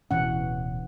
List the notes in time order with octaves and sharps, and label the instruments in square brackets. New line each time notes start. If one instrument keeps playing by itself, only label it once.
[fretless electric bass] D1 B2 C#4 [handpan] E3 F#5